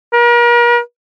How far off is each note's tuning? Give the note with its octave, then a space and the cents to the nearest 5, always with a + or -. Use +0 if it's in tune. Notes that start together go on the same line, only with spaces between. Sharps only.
A#4 +40